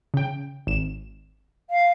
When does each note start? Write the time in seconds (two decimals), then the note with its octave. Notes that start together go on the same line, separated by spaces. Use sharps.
0.14 C#3 G5
0.67 G#1 E7
1.70 F5